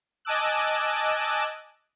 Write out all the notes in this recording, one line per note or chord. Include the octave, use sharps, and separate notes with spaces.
D#5 G#5 A5 D6 E6 F#6